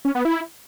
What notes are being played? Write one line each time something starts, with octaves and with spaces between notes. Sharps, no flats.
C#4
B3
E4